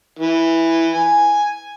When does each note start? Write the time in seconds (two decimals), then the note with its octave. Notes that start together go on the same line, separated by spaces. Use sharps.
0.19 E3
0.95 G#5